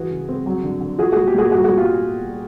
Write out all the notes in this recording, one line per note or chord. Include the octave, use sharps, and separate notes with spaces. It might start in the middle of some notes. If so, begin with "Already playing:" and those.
Already playing: E3 F#4 G#4
C#3
C4
F#3
D3
D3
F3 F#4 G#4
A#2 F#4 G#4
G4
A#2 F#4 G#4
G3 F#4 G#4
F#4 G#4
A#2
F4 G4